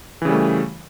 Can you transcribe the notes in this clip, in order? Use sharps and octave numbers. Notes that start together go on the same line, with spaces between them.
C#3 E3 G3 A3